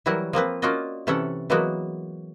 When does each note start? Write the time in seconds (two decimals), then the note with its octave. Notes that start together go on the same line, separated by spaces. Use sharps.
0.06 E3 F#3 G3 E4 F#4 A#4
0.33 F3 A#3 C4 B4
0.62 A#3 C#4 F4 F#4 D5 D#5
1.07 C3 E3 C#4 A4 E5 F#5
1.50 E3 F#3 G#3 A#3 B3 F#4